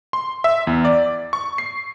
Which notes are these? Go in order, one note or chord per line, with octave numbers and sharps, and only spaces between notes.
C6
E5
E2
D5
C#6
C7